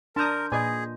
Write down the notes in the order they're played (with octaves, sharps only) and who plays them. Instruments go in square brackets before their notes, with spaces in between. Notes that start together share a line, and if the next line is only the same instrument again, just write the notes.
[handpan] D4 [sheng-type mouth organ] A#4 [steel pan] A5 A#5 D#6 [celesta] C6 G6
[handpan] A#2 D#5 [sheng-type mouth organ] G#4 [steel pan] B4 D5 G#5